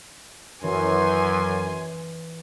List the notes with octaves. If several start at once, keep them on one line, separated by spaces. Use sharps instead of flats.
F#2 E3 G#5 C6